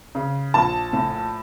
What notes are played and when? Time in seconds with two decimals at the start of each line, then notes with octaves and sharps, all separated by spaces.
0.15 C#3
0.54 A#1 A5
0.93 A2